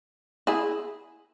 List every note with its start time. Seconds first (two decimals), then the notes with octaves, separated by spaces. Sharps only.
0.47 E4 G#4